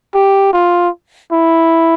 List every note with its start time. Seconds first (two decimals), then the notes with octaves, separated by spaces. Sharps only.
0.14 G4
0.53 F4
1.33 E4